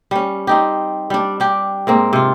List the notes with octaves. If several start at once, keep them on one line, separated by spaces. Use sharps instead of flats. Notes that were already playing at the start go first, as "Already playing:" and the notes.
G3 C#4
C4 D#4 G4
G3 D4
D4 G4
G#2 A#3 C4
C3 F4